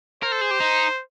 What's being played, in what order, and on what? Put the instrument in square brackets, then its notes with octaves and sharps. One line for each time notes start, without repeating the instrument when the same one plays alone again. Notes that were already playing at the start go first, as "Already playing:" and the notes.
[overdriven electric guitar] A#4 [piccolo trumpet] C5
[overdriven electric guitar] A4
G#4
G4
D#4